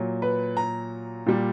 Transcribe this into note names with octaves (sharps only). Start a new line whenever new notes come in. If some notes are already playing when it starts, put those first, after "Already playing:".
Already playing: A#2 F#3
B4
A#5
A#2 G3